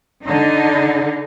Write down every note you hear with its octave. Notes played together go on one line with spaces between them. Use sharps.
D3 D#4